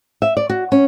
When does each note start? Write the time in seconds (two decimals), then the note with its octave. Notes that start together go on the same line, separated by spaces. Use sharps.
0.22 E5
0.37 D5
0.50 F#4
0.72 C#4